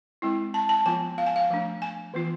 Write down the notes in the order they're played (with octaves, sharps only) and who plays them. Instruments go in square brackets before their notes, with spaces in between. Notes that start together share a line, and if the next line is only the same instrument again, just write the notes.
[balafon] G#3 C4 E4
A5
A5
F3 B3 F4 G#5
F5
G#5
F5
F3 A3 D4
G#5
E3 B3 F4